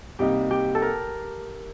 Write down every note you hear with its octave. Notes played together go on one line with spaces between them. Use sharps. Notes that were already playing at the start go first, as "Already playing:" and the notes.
C2 C3 G3 A#3 D#4 G4
G4
A4
A#4